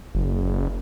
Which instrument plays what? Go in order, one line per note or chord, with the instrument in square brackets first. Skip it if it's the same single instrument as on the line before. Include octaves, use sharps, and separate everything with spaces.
[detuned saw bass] F#1